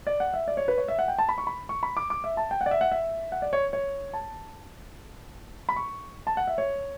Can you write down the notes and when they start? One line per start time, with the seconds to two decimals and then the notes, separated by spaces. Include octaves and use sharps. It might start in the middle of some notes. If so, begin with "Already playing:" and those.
0.07 D5
0.20 F#5
0.34 E5
0.48 D5
0.57 C#5
0.68 B4
0.78 C#5
0.88 E5
0.99 F#5
1.08 G5
1.19 A5
1.29 B5
1.38 C#6
1.47 B5
1.69 C#6
1.83 B5
1.97 D6
2.10 D6
2.24 E5
2.37 A5
2.51 G5
2.61 F#5
2.66 D5
2.71 E5
2.81 F#5
2.92 E5
3.32 F#5
3.42 D5
3.53 C#5
3.73 C#5
4.14 A5
5.69 B5
5.76 C#6
6.27 A5
6.37 F#5
6.47 E5
6.58 C#5